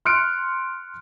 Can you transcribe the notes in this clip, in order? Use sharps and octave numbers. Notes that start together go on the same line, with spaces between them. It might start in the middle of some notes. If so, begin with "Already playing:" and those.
C6 F6 F#6 C#7 D7